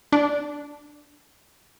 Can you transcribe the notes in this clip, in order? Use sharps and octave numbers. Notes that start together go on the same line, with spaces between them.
D4